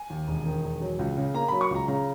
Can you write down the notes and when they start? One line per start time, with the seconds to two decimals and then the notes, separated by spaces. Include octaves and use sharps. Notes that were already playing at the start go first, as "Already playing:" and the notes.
Already playing: G#5
0.10 D#2
0.28 E1
0.45 D#3
0.64 E1
0.81 F#3
0.99 C#2
1.17 C#3
1.34 A#3 A#5
1.48 F#3 B5
1.61 C#6
1.71 C#2 A#5
1.88 C#3 A#5